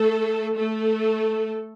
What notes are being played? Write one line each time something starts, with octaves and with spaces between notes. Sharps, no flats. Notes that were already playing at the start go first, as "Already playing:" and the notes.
Already playing: A3 A4
A3 A4